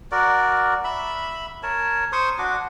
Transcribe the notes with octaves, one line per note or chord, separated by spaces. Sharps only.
F#4 A#4 D5
E5 B5
A#4 C#5 A5
C5 C6 C#6 D#6
D4 F#4 D6